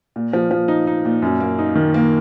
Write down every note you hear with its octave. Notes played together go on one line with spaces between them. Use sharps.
A#2
F3
F3
D#4
D#4
A#2
F#2
A#3
D#4
D#3
A#3